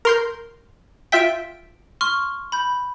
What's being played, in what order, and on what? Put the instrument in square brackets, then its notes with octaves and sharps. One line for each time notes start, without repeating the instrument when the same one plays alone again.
[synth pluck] A#4 C6 G6
[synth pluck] F4 E5 G5 [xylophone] B6 D7
[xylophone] C6 C#6 F6
B5 G6